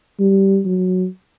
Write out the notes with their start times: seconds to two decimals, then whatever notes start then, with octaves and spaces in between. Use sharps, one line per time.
0.19 G3
0.65 F#3